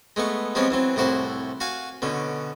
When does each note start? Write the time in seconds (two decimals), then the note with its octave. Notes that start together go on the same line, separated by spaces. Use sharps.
0.16 G#3 A3 B3 C#6
0.55 F3 G3 G#3 B3 C4 C#5
0.71 E3 F#3 C4
0.96 C2 A2 E4 F#4 C5 A5
1.60 F#4 F5 G#5
2.02 B2 D3 C#4